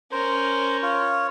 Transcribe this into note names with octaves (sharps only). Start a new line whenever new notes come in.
C#4 A#4 C5
F4 C#5